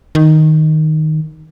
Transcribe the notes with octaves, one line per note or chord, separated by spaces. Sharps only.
D#3